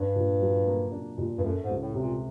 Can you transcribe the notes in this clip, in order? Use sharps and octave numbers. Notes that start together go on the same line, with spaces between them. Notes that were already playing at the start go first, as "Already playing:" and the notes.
Already playing: G2 D4
A#2
F#3
A#3
D4
A#2
G2
F#2 A3
G#2
C#2
A2
C3
A#2